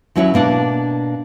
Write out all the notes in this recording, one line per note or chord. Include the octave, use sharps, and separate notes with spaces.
D#2 F#3 C#4 E4 C#5 F#5
B2 A#3 D4 F#5